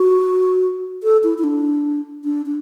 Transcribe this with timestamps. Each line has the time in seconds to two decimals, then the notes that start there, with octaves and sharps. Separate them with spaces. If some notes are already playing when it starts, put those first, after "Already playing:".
Already playing: F#4
1.03 A4
1.24 E4
1.38 E4
1.44 D4
2.24 D4
2.46 D4